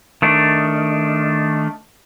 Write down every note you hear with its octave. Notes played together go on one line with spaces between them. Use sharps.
D#3 A3 D4